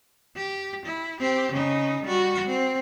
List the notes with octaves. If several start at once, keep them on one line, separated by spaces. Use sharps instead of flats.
G4
E4
C4 G4
C#3 D#4
G3 F#4
C4